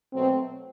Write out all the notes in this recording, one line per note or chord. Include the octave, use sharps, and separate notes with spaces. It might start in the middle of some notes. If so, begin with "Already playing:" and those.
B2 F#3 A3 C4